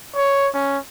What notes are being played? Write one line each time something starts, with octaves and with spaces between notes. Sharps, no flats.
C#5
C#4